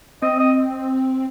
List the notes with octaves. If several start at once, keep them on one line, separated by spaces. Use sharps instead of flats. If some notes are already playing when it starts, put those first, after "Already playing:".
C4 D#5
D#5